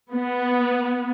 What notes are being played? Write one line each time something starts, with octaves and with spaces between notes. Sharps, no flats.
B3